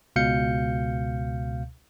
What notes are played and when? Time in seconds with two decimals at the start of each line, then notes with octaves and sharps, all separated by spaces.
0.16 C#2 B2 F5 G6 C#7